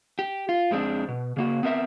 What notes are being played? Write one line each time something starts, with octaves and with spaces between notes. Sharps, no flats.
G4
F4
F2 G#3 C4 D4
B2
C#3 A#3 F#4
B3 C4 A#4 D#5 E5